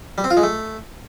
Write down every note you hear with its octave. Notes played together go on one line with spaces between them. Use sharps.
G3
C4
F4
G#3
A3